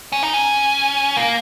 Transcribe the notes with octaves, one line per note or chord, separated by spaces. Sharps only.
C#4
D#4
C#4
A#3